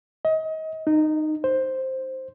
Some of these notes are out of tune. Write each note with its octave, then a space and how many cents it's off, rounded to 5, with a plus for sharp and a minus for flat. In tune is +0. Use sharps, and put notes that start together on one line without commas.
D#5 +30
D#4 -15
C5 +5